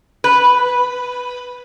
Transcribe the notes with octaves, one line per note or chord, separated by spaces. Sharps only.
B4